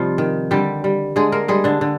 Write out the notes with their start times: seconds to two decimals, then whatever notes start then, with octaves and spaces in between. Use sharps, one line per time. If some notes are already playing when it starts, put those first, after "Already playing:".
Already playing: C3 F3 G3 C4 D#4 F4
0.18 D#3
0.51 D3 G3 G4
0.84 G3
1.16 D3 G#3 G#4
1.32 A#3 A#4
1.48 G3 G#3 G#4
1.64 D3 D4
1.81 D3